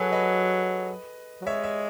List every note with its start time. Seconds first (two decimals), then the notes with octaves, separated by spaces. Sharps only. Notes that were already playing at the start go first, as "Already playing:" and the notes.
Already playing: F#3 F#4 G#4 A4 B4
0.12 B4 D#5
1.41 F#3
1.46 G#3 C#5 E5
1.64 E5